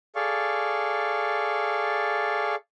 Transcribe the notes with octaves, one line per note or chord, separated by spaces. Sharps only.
G#4 A4 D5 F5 C#6